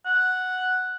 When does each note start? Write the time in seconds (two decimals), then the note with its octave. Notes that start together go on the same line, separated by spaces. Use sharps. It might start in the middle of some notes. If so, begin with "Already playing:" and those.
0.05 F#5